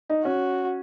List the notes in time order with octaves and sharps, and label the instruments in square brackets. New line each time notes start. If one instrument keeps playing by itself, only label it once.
[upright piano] D#4
[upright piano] C#4 [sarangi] F#4